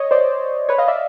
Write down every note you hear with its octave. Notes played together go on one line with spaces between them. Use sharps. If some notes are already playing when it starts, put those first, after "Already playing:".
Already playing: C#5 D#5
C5 D5
B4 C#5
D#5 F5
D5 E5